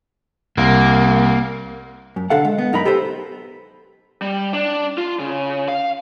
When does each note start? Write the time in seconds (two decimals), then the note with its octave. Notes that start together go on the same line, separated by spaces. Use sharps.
0.57 C2 A#3
2.16 F#2
2.30 B1 D3 A4 F5 F#5
2.45 G#3
2.58 B3
2.73 F#2 D#4 A#4 B5
2.85 G4 A4 B4 C5
4.22 G3
4.53 D4
4.98 F4
5.19 C#3
5.68 F5